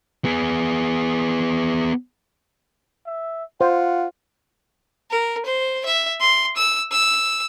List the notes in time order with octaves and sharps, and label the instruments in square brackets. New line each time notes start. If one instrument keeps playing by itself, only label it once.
[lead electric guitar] B3 G#4
[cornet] E5
[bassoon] F4 [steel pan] C5 [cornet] F#5
[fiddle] A#4
C5
E5
C6
E6
E6